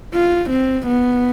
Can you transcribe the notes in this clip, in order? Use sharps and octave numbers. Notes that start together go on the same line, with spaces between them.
F4
C4
B3